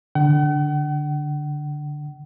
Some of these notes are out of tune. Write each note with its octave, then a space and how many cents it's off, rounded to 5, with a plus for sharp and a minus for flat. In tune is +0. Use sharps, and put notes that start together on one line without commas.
D3 +0 F#5 +45